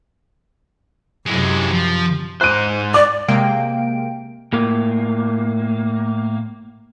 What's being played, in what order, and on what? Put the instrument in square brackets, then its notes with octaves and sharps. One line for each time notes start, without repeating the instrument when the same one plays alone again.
[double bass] F#2 C3 [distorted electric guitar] G#3 E4
[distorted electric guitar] F3
[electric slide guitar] G#2 C5 [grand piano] F#6 D#7
[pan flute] D5 [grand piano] D6
[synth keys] C3 G#3 A#3 F5 G5 D7
[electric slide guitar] A2 A#3